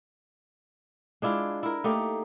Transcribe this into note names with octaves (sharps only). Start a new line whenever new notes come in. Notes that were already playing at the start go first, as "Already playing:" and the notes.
G#3 D4 E4 F4
E4 A#4
A3 A#3 D#4 G4